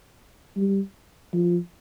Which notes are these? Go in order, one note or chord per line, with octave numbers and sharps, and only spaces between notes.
G3
F3